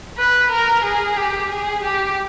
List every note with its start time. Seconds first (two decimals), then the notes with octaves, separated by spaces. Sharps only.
0.18 B4
0.50 A#4
0.84 G#4
1.17 G4
1.50 G#4
1.84 G4